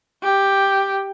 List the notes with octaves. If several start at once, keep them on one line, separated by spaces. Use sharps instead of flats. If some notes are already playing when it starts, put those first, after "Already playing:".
G4